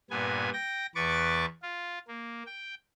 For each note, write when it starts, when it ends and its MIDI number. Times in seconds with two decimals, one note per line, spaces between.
0.10 0.50 43
0.10 0.50 46
0.10 0.50 59
0.10 0.50 80
0.53 0.86 79
0.53 0.86 94
0.95 1.46 40
0.95 1.46 71
0.95 1.46 85
0.95 1.46 86
0.95 1.46 93
1.62 1.99 65
2.08 2.43 58
2.46 2.75 79